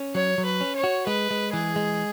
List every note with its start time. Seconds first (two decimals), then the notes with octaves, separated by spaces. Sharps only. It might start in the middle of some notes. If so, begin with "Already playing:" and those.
Already playing: C#4
0.15 F#3 C#5
0.38 F#3
0.45 B4
0.61 C#4
0.76 C#5
0.84 F#4
1.06 G#3 B4
1.31 G#3
1.53 E3 G#4
1.76 G#3